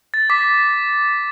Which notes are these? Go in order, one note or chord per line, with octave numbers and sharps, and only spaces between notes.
A6
D6 B6